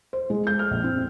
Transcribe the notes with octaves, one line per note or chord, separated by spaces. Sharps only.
C5
G#3
G6
F6
A#1
C4